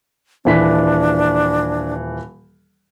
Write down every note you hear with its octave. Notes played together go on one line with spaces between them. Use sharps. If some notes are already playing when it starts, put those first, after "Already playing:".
D#1 E3 D4 B6